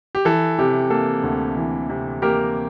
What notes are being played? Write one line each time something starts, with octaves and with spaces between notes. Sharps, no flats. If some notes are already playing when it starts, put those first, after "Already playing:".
G4
E3 A4
C3 G4
A#3 A4
D2
E3
C3
A#3 G4 A#4